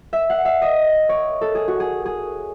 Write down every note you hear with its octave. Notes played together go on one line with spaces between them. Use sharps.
E5
F#5
E5
D#5
C#5
A4
G#4
F#4
G#4
G#4